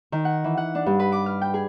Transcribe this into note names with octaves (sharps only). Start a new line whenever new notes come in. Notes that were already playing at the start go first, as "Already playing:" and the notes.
D#3
F#5
E3
F#5
D4
G2
B4
D6
F6
G5
G#4